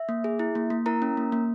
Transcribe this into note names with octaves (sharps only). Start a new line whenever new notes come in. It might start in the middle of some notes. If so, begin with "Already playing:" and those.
Already playing: E5
A#3
G#4
E4
A#3
A#3
E4 A#4 A#5
C#4
A#3
A#3